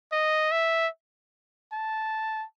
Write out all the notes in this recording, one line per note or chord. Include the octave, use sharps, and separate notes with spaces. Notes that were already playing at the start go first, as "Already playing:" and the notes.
D#5
E5
A5